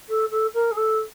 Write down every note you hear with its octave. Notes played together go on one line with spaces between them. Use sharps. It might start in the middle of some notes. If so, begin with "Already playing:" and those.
A4
A4
A#4
G#4
A4